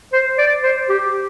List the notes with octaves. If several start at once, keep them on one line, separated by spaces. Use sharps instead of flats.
C5
D5
C5
G4